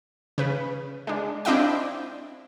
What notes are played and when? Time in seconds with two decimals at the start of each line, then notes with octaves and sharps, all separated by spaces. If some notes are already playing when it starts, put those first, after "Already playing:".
0.38 C#3 B4
1.07 G#3 D4
1.45 C4 D4 E4 D#5 F5 G5